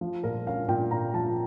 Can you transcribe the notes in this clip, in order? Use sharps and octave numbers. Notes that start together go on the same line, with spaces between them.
F3
A#2 A#4
C#4 F5
A#2 G5
A#2 A#5
F3 A5